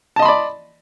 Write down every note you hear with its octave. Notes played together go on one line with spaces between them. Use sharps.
D5 D#5 A5 B5 C6